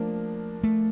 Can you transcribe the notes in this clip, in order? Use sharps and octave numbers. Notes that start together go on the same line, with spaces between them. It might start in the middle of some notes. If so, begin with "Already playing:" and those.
Already playing: F3 A3 A#3 D4
A3